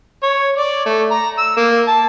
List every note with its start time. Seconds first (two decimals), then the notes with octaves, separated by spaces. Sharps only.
0.23 C#5
0.58 D5
0.86 A3
1.11 A#5
1.38 E6
1.57 A#3
1.88 A5